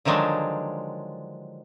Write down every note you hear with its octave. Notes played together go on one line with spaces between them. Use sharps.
D3 D#3 F3 F#3 G#3 D4